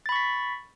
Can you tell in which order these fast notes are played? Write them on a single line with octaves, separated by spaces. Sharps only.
A6 B5 C#6 B6